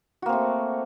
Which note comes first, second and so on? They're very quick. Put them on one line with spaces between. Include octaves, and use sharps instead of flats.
F#4 A#3 C4 A3